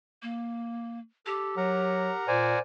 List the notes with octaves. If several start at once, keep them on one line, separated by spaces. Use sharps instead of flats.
A#3
G4 A4
F#3 A#4 F#5 A#5
A#2 C5 D5 G#5